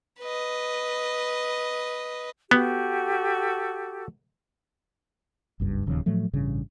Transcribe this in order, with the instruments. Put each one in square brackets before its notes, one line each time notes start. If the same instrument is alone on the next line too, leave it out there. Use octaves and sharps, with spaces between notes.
[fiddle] B4 D#5
[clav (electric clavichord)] B3 [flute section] F#4 G4 A4
[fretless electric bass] F#1 C#2 G2
D1 D#2 C#3 F3
A2 F3 F#3 A3
A1 G2 C#3